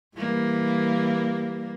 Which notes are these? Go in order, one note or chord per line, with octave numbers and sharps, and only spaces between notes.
E3 G3 A#3